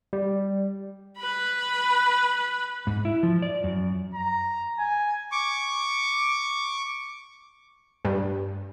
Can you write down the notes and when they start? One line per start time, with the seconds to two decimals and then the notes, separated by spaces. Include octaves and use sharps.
0.13 G3
1.19 B4 B5
2.87 G#2
3.05 E4
3.23 F3
3.42 D5
3.64 F#2
4.14 A#5
4.79 G#5
5.32 C#6 D6
8.05 G2